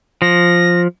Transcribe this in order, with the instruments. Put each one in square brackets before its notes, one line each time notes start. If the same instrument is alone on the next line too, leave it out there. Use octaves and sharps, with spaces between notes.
[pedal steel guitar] F3 [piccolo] A#6